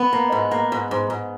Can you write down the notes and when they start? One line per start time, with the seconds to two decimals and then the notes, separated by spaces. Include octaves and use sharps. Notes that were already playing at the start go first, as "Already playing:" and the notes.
Already playing: B3
0.13 A#3
0.32 G#2
0.51 A#3
0.72 G#2
0.91 G#2
1.10 G#2